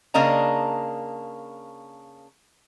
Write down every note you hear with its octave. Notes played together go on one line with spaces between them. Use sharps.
C#3 A#3 D4 D#5 A#5